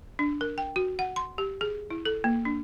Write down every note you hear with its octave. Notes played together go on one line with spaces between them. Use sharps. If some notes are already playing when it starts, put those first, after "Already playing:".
D4
A#4
G5
F#4
F#5
C6
G4
G#4
E4
A4
A#3
D4